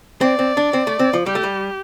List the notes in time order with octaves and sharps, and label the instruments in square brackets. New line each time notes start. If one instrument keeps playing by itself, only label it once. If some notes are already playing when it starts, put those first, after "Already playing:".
[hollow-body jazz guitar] C4 [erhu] D5
[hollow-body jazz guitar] C4
D4
C4
A3
C4
F3
[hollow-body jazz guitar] G3 [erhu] G4
[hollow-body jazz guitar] A3
G3